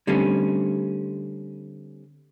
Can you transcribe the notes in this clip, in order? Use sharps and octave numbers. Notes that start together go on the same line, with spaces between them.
D3 G3 A3 C4 C#4